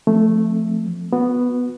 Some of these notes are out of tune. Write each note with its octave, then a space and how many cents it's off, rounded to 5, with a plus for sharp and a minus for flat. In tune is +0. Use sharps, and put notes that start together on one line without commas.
F3 +0 A3 +0 C4 +0
B3 +0 F#4 -30